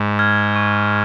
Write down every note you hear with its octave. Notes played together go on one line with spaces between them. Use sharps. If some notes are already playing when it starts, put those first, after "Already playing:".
Already playing: G#2
F6 G#6
C#6